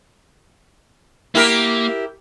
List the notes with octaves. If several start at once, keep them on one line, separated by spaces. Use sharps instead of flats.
A#3 E4 G4 A#4